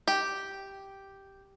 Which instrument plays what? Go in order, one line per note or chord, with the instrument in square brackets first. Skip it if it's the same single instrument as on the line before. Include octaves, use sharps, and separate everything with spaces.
[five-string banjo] G4